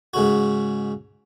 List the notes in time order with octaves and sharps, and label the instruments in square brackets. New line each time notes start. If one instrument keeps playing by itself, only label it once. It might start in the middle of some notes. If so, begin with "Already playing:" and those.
[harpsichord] G#2 C#3 F#4